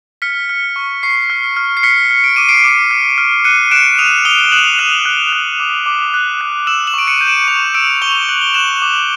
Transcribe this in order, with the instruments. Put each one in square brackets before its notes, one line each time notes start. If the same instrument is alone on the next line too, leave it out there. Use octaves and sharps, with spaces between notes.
[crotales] F6 B6 C#7
F6
C#6
C#6 C7
F6
F6
C7
F6 B6 C#7
F6
D7
D6 D#7
C7 D7
D6
F6
F6
F#6 C#7 D#7
F#6 D7 E7
D#6 D#7 F7
D#6 F7 G7
F#6 E7 F#7
F#6 D#7 F7
F#6
F#6
D6
D6
F#6
F#6
E6 E7 F#7
E7 F#7
C#6 D7
C#7 D#7
G6 D#7
D7 E7
C#6 D#7 F7
E6 D7 E7
C#6 F7 G7
F#6 F#7
G7
F#6 E7 F#7
D6